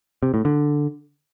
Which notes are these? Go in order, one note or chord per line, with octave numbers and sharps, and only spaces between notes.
C3
A2
D3